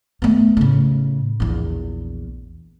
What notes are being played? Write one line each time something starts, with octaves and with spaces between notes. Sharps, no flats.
A3 B3
A2 C#3
A#1 E2